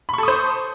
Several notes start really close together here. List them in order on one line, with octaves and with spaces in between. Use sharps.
B5 C#6 A4 D#6 C5